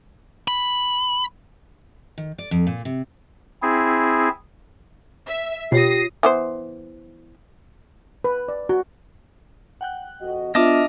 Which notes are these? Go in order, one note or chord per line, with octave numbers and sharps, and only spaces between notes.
B5
D#3
D5
F2
A#2
C3
C4 E4 G#4
E5
B2 F4 G4 C#5 D#6 A#6 C7
E3 B3 C5
B4
D5
F#4
F#5 G5 F#6
F2 F#4 D#5
B3 D4 F4 D#5 E5 A5 D6 F6